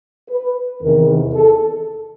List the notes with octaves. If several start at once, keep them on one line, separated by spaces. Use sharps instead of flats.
B4
E2 C3 D#3 A#4
A4